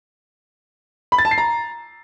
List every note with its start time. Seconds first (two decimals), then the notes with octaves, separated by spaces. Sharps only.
1.12 B5
1.18 A6
1.25 A5
1.31 C7
1.38 A#5